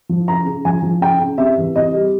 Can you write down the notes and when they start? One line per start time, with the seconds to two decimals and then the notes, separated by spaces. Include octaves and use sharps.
0.09 F3
0.28 C#3 A#5
0.46 C#3
0.65 F3 G#5
0.83 F3
1.01 C#3 G5
1.20 C#3
1.38 C3 E5
1.57 E3
1.75 C3 D#5
1.94 G3